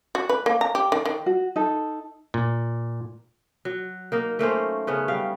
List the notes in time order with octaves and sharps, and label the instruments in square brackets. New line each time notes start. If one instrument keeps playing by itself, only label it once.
[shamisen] F#4
B4
A#3
A#5
G4
D#3
D#3
[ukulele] F#4
D#4 A4
[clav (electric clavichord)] A#2
[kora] F#3
A#3 D#4 A#4
A3 A#3 C#4 C5
C#3 B3 C#4
G3 F5